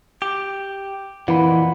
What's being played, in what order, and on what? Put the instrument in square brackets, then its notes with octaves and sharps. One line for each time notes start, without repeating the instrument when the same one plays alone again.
[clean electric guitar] G4
[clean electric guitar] F2 A#2 [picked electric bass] E3 [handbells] F#5 B5